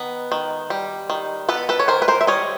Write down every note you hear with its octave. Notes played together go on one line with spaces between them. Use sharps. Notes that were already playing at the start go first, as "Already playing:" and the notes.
Already playing: D#3 B3
D#3
G3
D#3
B3 A4 B4
A4 B4
C#5
D#3 A#4 C5
B4
A#4 C5
E5
G3 C#5 D#5